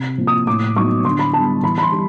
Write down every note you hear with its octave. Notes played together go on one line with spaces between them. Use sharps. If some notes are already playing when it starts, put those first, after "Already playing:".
Already playing: C3
F3 A#3
D#6
A2 D6
F#3 B3 D#4 C#6
D3 C6
B5
G3 B3 A5
E3 B5
B5
C6
G3